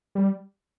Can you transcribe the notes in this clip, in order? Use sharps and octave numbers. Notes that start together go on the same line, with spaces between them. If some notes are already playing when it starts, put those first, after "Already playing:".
G3